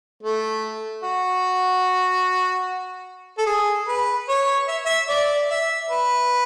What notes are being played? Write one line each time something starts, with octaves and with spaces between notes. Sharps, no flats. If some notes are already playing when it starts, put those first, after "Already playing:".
A3
F#4
A4
G#4
B4
C#5
E5
E5
D5
E5
B4